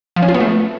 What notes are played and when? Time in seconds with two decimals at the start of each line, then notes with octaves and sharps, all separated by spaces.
0.16 F3
0.22 C#4
0.28 F4
0.34 B3
0.40 A3